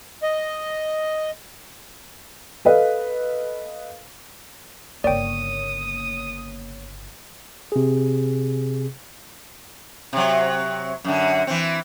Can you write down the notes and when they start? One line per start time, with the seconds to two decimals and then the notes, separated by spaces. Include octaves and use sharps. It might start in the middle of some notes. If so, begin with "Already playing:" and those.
0.23 D#5
2.65 A4 B4 D#5 F5
5.04 G1 C#3 A#3 C#5 D5 G5 D#6
7.72 C3 G#4
10.13 C3 F#3
11.04 F#2 D3
11.47 E3 C4